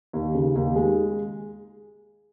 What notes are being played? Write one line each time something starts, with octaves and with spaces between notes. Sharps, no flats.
D#2
C#3
D#2
G#3